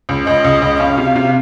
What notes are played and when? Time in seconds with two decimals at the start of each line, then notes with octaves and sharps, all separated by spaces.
0.09 C#2
0.27 C#2 D#5
0.44 C#2
0.62 C#2
0.80 C#4 F5
0.98 C3
1.15 C3